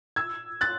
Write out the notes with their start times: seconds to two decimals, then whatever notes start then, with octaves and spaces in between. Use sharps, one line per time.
0.16 E6 G#6
0.61 F#6 A6